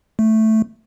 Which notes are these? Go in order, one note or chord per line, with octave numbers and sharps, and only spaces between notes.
A3